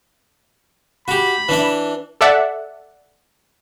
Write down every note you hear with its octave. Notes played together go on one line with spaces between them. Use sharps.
F#4 G4 B5
E3 D4 E4
A4 D5 E5 F#5